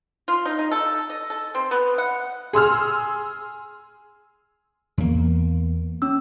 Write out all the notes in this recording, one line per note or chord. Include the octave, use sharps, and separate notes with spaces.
F4
D#4
D#4
A4
D#5
A4
C4
B3
F#5
G#4 C6 E6 F6
E2 A#3
C#4 E6